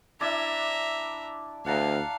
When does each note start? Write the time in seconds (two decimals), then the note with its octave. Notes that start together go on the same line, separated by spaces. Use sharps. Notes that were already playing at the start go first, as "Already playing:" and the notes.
0.21 D4 E4 D5 E5 A#5
1.66 D2 F5 F#5 A5 A#5